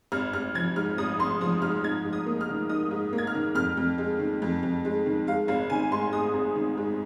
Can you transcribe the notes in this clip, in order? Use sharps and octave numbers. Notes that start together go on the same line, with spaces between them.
G#1 F6
G#1 F6
F3 G#6
G#2 F6
G#1 D#6
G#1 C6
F3 D#6
G#2 F6
D#4 G#6
G#2
D#6
A#3
F6
D#3
D#4 D#6
G#2
A#3
G#6
F6
D#3
F2 F6
F2
G#3
D#3
F2
F2
G#3
D#3
G#3 F5
G#1 F5
D#3 G#5
G#2 C6
G#3 D#6
G#1
D#3
G#2